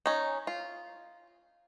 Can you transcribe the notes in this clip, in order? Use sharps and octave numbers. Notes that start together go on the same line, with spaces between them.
C#4 D#4
F4